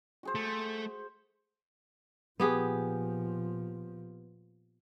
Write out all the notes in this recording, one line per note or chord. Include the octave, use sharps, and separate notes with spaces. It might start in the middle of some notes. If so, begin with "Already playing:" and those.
F#4 G#4 C5
A3
A#2 F3 B3 G4 G#4